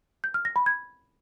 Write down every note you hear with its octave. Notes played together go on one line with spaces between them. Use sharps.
G6
F6
A#6
B5
G#6